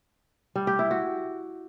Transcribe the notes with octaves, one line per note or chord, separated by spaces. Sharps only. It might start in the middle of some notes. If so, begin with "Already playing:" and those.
G3
G4
E4
F#4